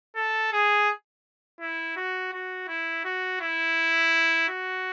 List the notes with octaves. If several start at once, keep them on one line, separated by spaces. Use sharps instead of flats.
A4
G#4
E4
F#4
F#4
E4
F#4
E4
F#4